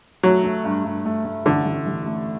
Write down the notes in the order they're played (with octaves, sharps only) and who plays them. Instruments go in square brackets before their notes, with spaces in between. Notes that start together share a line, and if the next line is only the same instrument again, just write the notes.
[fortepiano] F#3 [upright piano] A3
[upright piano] A3
G2
G2
A3
A3
[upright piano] A1 [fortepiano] D3
[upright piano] A1
A1
A3